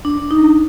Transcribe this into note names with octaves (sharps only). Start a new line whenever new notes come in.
D4
D#4